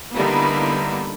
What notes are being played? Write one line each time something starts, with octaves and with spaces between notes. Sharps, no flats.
D3 G3 A#3 B3 D#4 E4